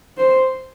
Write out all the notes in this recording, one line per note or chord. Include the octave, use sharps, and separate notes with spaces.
C5